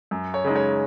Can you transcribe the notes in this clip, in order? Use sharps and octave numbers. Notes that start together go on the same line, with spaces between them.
F#2
C#5
C#3 G#3 D#4
C#5